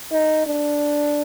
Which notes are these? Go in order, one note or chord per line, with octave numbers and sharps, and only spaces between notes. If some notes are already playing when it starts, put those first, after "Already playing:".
D#4
D4